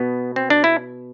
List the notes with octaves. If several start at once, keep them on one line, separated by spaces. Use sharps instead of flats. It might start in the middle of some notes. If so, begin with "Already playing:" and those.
Already playing: B2 B3
C4
D4
E4